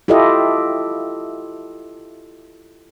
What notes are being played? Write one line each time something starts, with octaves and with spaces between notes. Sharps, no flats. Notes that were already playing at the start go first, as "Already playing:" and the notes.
E4 F4 G4 A4 D#5 E5